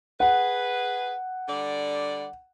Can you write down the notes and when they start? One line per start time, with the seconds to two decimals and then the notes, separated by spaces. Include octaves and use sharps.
0.20 G#4 B4 F#5
1.48 D3 G3 D5